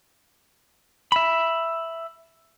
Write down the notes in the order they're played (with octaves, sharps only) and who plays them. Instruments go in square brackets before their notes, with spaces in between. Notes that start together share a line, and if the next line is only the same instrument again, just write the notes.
[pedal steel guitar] E5 B5